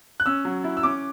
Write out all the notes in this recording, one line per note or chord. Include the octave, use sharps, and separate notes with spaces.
F#6
C#4 E6
F#3
E4
E6
C#4 D6